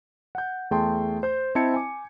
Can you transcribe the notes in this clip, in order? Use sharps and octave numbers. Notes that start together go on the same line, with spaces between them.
F#5 G6
E2 A3 G#4 G5 A5 C6
C5 G6
C4 E4 D#5 A5 G#6 C#7
G#5 D6